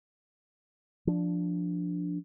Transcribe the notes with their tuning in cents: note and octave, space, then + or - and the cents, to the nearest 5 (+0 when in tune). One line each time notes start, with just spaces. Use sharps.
F3 +0 D4 +0